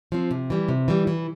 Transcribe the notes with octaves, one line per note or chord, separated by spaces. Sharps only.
F3 C4
C3
E3 G3
C3
E3 G3
E3